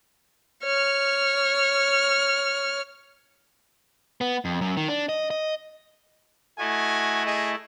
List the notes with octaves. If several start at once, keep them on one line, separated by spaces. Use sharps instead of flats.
C#5 F6
B3
F2
F#2
D#3
D4
D#5
D#5
A3 E4 F#4 D#5 G#5
G#4 D#5